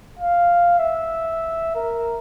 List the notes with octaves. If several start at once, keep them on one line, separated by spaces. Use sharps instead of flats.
F5
E5
A#4